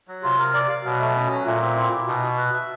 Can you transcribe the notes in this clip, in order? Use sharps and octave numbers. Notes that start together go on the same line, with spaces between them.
F#3
C3 F4
A#4
D5
F5
B2 F#3
A3
C#4
F#3
A#2 A3
C4
E4
G4
B2 D#4
F#4
B4
E5